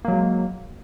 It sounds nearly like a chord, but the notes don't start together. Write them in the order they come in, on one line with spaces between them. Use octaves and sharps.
A#3 F#3 G#3